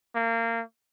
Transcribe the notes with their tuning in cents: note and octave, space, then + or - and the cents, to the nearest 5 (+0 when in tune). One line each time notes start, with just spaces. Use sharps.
A#3 -25